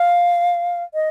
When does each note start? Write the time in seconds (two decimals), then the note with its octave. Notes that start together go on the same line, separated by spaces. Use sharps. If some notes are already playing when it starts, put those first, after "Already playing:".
Already playing: F5
0.94 D#5